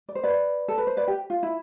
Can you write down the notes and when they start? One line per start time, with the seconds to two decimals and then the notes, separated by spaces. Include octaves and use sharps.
0.09 D5
0.15 C5
0.23 B4 D5
0.68 A4
0.78 B4
0.87 C5
0.97 B4 D5
1.08 G4
1.30 F4
1.43 E4